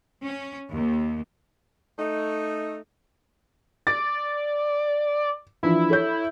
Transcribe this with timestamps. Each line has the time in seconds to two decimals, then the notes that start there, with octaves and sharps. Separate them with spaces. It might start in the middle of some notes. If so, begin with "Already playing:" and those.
0.23 C#4
0.70 D#2
1.98 A3 D#4
3.87 D5 A6
5.63 E3 F3 D4 E4
5.90 A4 C#5 G6